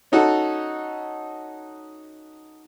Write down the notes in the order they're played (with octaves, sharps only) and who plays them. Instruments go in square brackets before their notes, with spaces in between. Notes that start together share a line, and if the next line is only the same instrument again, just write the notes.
[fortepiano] C#4 D#4 F#4 A4